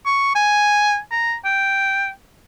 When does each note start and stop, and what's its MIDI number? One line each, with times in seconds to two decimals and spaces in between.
0.06 0.30 85
0.35 0.99 80
1.12 1.34 82
1.45 2.09 79